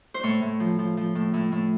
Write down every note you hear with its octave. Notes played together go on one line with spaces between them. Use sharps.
C5
A2 C#5
A2
F3
F3
F3
A2
A2
A2